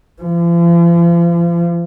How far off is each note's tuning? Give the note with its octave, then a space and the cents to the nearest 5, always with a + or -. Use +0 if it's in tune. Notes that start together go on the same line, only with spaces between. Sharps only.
F3 -40